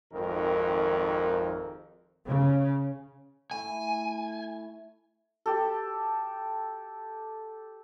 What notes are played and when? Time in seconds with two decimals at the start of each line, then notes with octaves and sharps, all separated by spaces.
0.13 G#1 F2 D#3 A#4
2.28 C#3
3.51 A3 E4 G#5
5.46 G4 A4